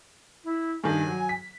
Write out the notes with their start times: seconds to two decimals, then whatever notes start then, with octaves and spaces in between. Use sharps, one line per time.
0.44 E4
0.84 G2 D#3 G#5
1.07 F#3
1.29 B6